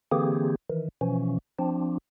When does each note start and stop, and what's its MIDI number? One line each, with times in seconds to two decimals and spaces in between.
0.11 0.55 50
0.11 0.55 52
0.11 0.55 58
0.11 0.55 60
0.11 0.55 67
0.11 0.55 68
0.70 0.89 51
0.70 0.89 52
1.01 1.38 47
1.01 1.38 52
1.01 1.38 53
1.01 1.38 61
1.59 1.98 53
1.59 1.98 60
1.59 1.98 62